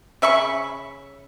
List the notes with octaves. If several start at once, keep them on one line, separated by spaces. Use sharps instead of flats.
C#3 E5 B5 C#6